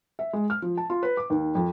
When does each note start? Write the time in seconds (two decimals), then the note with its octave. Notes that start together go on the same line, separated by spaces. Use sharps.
0.19 E5
0.33 G#3
0.50 F6
0.62 F3
0.77 A5
0.90 F4
1.03 B4
1.17 D6
1.30 D#2
1.55 F2